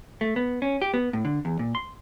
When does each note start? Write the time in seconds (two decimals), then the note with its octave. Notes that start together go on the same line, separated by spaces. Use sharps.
0.21 A3
0.36 B3
0.62 C#4
0.82 G4
0.94 B3
1.13 A2
1.25 D3
1.45 E2
1.59 A#2
1.75 C6